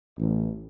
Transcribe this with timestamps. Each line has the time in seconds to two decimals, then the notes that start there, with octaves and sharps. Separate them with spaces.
0.19 A1